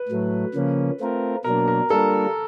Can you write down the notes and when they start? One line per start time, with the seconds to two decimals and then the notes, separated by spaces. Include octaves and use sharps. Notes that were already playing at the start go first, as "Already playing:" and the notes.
Already playing: B4
0.09 A2 F#3 A3
0.54 C#3 F3 A#3 C#4
1.00 A3 C4 F4 A#4
1.44 B2 F#3 A#3 D4 A#4
1.68 A#4
1.90 G3 A#3 D4 F4 A4 A#4